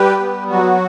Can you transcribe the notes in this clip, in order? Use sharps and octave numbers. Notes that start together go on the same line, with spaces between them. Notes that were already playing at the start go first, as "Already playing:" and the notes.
Already playing: G3 G4 B4
B3
F#3 F#4